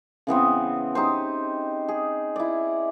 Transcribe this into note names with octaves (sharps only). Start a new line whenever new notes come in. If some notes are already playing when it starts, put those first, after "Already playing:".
C#3 E3 B3 C4
D#4 G4 C5
G#4
E4 D5